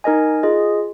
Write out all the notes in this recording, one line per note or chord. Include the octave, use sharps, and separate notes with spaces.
D#4 A#4 D#5 G#5
F4 G#4 D#5